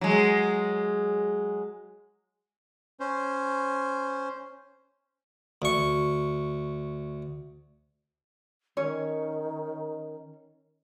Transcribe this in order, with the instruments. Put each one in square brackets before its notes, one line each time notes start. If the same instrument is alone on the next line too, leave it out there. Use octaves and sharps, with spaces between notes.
[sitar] F#3 G#3
[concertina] C#4 C5
[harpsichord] D2 C#6
[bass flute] D#3 [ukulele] C#4 C#5